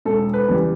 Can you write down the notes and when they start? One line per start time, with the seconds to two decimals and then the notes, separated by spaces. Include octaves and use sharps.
0.05 E1 A4
0.34 B4
0.48 E2 C#3 G3